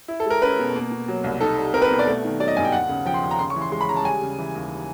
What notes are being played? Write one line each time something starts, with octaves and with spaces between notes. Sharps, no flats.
E4
A4
G#3 A#4
C#4 B4
B2
A#3
B2
F#3
C2
D#4 A4
G3
C4 A#4
B4
B2
D5
A3
D#3
F#3 D5
D#5
G2 G#5
G5
D#2 F#5
C#3
F3 G5
C6
D#2
A#5
C#3 C6
C#6
E3
C6
G#3 C6
B5
C#3 A#5
A5
G3 G#5
C#3
E3
D#2